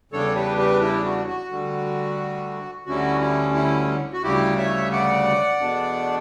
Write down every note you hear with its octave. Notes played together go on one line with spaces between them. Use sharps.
E2 C#3 G3 D4 A4 C#5
G4 B4
G4 B4
E4 G4
F#4
F#4
D2 D3 G3
D2 D3 G3 C#4 E4 F#4
E4
E4
F#4
D2 C#3 G3 E4 G4
C#5 E5
D5 F#5
E2 B2 A3 D4